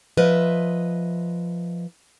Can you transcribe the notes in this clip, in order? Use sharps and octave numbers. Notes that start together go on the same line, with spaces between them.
F3 B4 D#5 E5